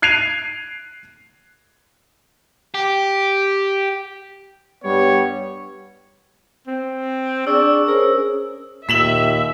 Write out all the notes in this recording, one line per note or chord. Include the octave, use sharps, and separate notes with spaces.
F#6 G#6 C7 D7 D#7 F7
G4
G2 G3 B3 C#5
C4
D4 G#4 C#6 E6
C#4 G#4 A#4 C5 C#5
D#2 A#2 E5 B6 E7 F#7